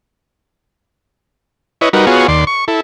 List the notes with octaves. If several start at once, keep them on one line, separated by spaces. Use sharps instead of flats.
E4 B4 C#5 D#5
G3 D#4 F#4 A#4 B4
B3 F4 F#4 G#4 C#5
D#2 D5 C6
C#6
E4 A4